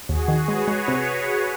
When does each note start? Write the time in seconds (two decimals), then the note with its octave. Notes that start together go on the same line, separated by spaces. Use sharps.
0.09 D#2 F#4 G#4
0.28 D#3
0.48 G#3 B4 C#5
0.68 G#3
0.88 C3